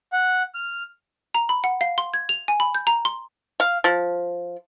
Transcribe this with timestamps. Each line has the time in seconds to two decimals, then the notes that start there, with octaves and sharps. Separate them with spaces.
0.13 F#5
0.55 F6
1.35 A#5
1.49 B5
1.64 F#5
1.81 F5
1.98 C6
2.14 G#6
2.29 F7
2.48 G#5
2.60 B5
2.75 G6
2.87 A#5
3.05 C6
3.60 F5
3.84 F3